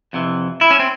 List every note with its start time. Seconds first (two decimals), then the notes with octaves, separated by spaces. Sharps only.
0.13 F2 C3 E3
0.61 E4
0.70 C#4
0.79 C4